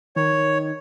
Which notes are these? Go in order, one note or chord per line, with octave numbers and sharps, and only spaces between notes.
D#3 C#5